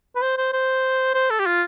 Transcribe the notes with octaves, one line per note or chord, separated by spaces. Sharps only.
B4
C5
C5
C5
C5
A4
G4
F4